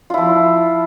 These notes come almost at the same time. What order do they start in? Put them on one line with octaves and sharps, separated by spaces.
F4 E4 F3